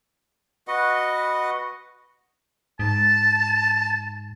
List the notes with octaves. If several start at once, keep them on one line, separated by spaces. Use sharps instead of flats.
F#4 B4 D#5 F#5
G#2 A5